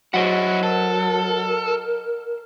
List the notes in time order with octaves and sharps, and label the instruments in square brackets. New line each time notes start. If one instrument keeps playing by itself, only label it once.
[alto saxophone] F#3 [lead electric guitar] E4 F#4 [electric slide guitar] C5 D#5 F#5
[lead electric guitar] A4 [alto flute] A#4